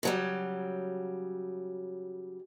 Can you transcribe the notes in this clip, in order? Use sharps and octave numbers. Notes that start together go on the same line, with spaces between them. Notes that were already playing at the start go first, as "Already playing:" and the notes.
C#3 F#3 G3